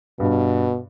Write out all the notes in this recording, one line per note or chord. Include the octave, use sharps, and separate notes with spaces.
G2 B2